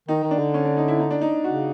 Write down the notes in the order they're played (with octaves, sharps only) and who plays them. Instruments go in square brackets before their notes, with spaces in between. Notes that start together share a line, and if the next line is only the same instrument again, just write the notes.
[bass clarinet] D#3 [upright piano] D#4
[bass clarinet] D#3
[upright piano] D4
[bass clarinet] D3
[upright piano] C#4
D4
D#4
E4
D#4
D4
D#4
[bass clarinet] C#3 [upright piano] F#4